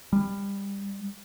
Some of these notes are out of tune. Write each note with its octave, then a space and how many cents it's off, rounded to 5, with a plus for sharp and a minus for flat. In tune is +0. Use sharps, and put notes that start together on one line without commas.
G3 +25